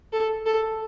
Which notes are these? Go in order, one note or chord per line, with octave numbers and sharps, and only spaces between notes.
A4
A4